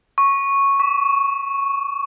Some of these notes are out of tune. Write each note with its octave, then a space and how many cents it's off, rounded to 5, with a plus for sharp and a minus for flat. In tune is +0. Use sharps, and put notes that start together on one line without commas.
C#6 -5
C#6 +35